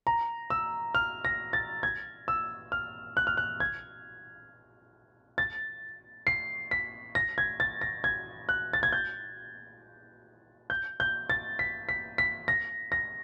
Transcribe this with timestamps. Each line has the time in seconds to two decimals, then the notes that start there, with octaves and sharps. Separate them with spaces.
0.07 A#5
0.50 E6
0.95 F6
1.25 A#6
1.53 A6
1.83 G#6
2.28 E6
2.72 F6
3.17 F#6
3.27 F6
3.37 F#6
3.60 G#6
5.38 A6
6.27 C7
6.71 B6
7.15 A#6
7.38 G#6
7.60 A6
7.81 A#6
8.04 G#6
8.49 F#6
8.73 A6
8.83 G#6
8.93 G6
10.70 G6
11.00 G6
11.30 A6
11.59 B6
11.89 B6
12.18 B6
12.48 A#6
12.92 A#6